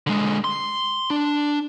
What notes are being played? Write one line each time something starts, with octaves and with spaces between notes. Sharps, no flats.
D3 G#3
C6
D4